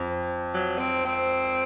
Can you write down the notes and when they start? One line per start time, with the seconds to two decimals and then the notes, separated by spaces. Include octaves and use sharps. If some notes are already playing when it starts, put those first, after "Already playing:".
Already playing: F2
0.54 F#3
0.78 C4
1.05 C4